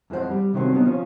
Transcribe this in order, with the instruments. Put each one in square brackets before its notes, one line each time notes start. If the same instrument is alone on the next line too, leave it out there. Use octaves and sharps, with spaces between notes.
[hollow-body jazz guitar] F2 E3 G#3 C4 C5 F#5
G3
C3 D#3 F#3 A3 C4 C#4
D3 G3 A#3 B3 D#4
F3 C#4